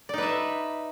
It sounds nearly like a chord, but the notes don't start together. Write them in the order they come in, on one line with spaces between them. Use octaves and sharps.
D5 D#4 B4 E5